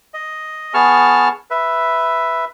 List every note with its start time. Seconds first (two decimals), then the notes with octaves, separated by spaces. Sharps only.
0.14 D#5
0.74 B3 G#4 A5 C#6 F6
1.51 B4 E5